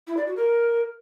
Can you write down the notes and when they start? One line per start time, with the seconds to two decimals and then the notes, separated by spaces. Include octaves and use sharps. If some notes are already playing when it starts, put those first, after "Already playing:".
0.07 E4
0.17 D5
0.27 F#4
0.36 A#4